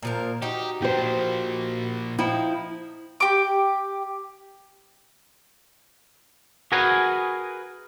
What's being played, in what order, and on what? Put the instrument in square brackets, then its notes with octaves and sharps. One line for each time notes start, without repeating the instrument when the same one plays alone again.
[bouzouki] A#2 F3 A#4
[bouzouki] D#4 F#4 [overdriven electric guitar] G4
[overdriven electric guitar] A#2 F3 [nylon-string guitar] G4 C5
[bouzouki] F3 D#4 [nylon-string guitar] E4 G5
[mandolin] G4 D6
[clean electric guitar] F#4 G#4 A#4 B4 G#5